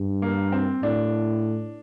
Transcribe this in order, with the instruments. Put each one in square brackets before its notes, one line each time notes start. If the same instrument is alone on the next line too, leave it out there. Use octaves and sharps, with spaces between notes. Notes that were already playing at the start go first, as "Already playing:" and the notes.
Already playing: [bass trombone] G2
[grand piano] A#3
C4
[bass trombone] A2 [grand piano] D4